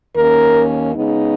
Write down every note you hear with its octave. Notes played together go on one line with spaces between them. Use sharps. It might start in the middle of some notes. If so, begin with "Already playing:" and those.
D#2 D#3 A#3 C#4 A#4
C#3 G#3 B3 D#4